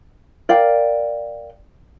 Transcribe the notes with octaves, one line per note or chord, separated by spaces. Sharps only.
A#4 D5 F5 G5